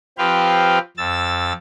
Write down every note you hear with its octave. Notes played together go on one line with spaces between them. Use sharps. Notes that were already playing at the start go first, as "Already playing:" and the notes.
F3 C4 G4 B4 F5 G5
F2 E6 A6